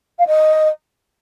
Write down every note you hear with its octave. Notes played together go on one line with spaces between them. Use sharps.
F5
D#5